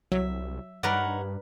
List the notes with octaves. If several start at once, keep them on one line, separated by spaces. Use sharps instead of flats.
C2 F#3 E5
G2 D#4 A#4 B4 C#5 D5 F#5